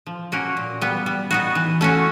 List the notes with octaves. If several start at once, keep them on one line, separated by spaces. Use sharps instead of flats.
F3
A#3 C#4 F#4 A#4
A#2
G3 B3
G3
B3 D#4 F#4
E3
A3 C#4 F#4